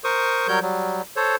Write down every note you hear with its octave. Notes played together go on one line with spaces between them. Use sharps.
A#4 C5 C#6 D#6
F#3 G3 A#4 C#5 G6
F#3 G3
A4 C5 C#5